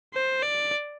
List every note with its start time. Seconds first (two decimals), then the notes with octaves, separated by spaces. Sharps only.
0.14 C5
0.43 D5